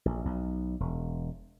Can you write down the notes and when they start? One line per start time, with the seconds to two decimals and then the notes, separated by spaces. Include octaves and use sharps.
0.05 A#1
0.25 B1
0.80 E1